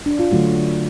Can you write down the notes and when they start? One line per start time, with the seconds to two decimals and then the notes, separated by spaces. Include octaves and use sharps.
0.06 D4
0.19 F4
0.31 D3 F#3 A3 F#4